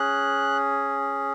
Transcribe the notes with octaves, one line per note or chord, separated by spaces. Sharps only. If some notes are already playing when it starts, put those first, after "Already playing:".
Already playing: C#4 G#4 F#6